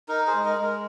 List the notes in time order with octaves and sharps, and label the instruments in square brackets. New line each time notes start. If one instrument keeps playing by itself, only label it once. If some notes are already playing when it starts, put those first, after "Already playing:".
[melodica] D#4 A#4
G#4 C5
G#3
A#4 D#5
G#3
A#4